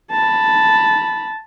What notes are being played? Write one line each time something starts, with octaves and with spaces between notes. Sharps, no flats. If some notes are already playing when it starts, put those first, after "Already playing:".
A5 B5